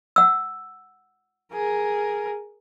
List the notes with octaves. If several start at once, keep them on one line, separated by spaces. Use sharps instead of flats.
F#5 E6
G#4 A#4